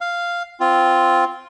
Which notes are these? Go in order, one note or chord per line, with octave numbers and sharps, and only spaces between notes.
F5
C4 F4